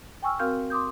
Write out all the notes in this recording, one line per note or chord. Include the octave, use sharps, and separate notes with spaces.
G5 G#5 C#6 E6 F6
C4 F#4 A#4 F5 F6 G6
C6 D6 D#6 G6